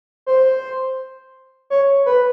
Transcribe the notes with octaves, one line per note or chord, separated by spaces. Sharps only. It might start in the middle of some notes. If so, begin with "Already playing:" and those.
C5
C#5
B4